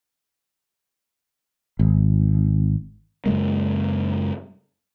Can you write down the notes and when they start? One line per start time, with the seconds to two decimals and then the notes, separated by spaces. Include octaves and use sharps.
1.79 G#1
3.26 F#2 C#3 G#3 A#3